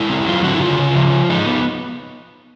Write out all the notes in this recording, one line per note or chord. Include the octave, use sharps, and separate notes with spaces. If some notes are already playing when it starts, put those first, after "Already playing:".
Already playing: G#3 E4
C4
F#3 F4
D3 F#4
E4
C#3 F4
C#3
F3
F3
G#3 D#4
B3